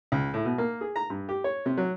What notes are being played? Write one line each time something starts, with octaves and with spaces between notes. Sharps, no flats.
C#2
A2
B2
A#3
G#4
A#5
G2
G4
C#5
C3
F#3